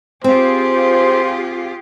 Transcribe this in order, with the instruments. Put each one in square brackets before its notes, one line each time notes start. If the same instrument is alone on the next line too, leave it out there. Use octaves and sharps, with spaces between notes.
[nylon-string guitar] C4 [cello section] F4 G4 G#4 [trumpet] C5